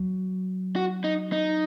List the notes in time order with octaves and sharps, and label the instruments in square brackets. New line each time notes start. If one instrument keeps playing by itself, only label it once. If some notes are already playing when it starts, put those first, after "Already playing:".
Already playing: [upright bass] F#3
[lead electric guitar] F#4
D#4
D#4